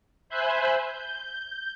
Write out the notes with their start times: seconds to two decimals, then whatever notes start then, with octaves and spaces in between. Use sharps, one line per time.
0.29 C5 E5 G#5 B5 F#6 G6
0.91 G6